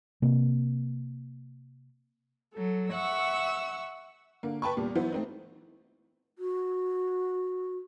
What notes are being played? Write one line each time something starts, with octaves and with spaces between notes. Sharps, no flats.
C3 A#3
F#3 A4
E5 F#5 C#6 E6
D3 A#3
B4 G5 A5 B5 C#6
E2 A#2 G3
E3 F#3 B3 E4 C5
A3 C4 D#4
F#4